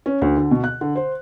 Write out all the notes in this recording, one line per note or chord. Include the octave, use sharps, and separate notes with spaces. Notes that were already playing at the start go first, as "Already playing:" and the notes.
C#4
D2
D3
B2
F#6
D3
C5